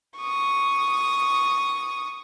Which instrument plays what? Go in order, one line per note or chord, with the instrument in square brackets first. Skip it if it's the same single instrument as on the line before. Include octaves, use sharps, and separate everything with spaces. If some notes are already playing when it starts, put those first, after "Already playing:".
[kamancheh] C#6 D#6